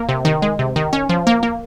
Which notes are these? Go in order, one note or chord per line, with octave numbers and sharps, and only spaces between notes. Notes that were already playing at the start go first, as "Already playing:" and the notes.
Already playing: A#3
C3
D#3
G#3
C3
D#3
C#4
F3
A#3
A#3